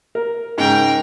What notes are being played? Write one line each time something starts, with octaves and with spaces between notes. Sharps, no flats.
A#4
G#2 C#3 A#4 G5